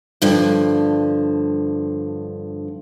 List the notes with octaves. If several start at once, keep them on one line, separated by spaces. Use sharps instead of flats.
G2 D3 F3